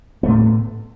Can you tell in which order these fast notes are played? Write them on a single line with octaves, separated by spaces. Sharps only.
B3 A3 A2